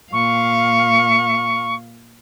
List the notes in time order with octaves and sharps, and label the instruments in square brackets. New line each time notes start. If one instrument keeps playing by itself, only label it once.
[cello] A#2 F5 [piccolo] C#6